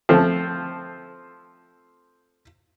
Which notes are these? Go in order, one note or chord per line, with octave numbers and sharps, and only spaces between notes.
F3 A3 C4